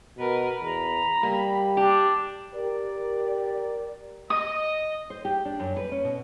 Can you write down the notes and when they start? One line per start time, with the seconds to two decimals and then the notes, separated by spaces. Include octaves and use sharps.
0.18 B2 A#4 B4
0.61 E2 A#5 B5
1.23 G3 A#3
1.77 D4 G4
2.53 G4 A#4 D5
4.30 D#5 D#6
5.10 C5
5.25 G4
5.45 D4
5.60 F#2
5.76 B4
5.92 C#4
6.04 B2